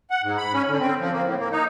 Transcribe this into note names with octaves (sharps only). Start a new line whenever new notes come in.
F#5
G#2
B5
C#4
D3
C4
F3
A#3
A2
A#3
D#4